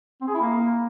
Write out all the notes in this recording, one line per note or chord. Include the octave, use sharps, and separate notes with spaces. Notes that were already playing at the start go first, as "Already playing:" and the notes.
C4
G#4
E4
A#3